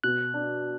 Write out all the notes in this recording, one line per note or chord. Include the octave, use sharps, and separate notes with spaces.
B2 F#6
D4